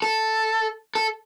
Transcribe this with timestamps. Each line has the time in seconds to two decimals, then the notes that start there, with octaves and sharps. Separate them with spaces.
0.02 A4
0.95 A4